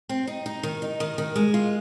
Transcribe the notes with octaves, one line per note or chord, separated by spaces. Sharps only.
C4
D#4
D#4
D#3
D#4
D#3
D#3
G#3
F4